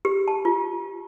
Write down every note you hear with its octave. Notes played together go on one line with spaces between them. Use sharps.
G4
A5
F4